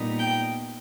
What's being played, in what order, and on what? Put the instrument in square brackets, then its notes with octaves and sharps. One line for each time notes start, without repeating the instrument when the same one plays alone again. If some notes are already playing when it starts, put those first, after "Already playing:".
Already playing: [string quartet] A#2 G3 B3 D#4
G5